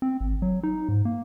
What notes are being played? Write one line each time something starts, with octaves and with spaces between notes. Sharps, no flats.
C4
G#1
F#3
D#4
G#2
A#3